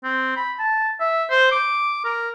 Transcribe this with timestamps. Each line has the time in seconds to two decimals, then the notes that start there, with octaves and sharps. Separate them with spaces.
0.04 C4
0.37 B5
0.59 A5
1.00 E5
1.31 C5
1.52 D6
2.05 A#4